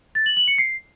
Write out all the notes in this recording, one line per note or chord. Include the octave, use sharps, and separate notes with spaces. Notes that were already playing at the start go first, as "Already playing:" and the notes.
A6
F#7
F#7
C#7
C7